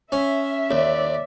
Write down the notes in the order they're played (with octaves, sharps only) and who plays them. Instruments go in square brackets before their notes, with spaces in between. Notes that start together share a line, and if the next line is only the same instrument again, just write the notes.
[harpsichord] C#4 [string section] E5
[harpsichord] D#2 [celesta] C#5 [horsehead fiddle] D5